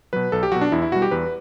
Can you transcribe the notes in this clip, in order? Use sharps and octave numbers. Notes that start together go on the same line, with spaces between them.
B2 F#3 B4
B1 A4
G4
B2 F#3 F#4
D4
E2 E4
E4
B2 G3 F#4
G4
E2 B4